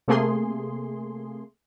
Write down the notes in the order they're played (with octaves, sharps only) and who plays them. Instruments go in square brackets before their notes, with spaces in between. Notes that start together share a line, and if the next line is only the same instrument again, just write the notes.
[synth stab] C3 A3 A#3 G#4 C6